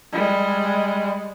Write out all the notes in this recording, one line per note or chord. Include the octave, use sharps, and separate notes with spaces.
G3 G#3